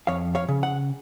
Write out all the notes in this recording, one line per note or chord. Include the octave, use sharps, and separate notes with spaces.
F2 C#5 F5
C#5 F5
C#3
F#5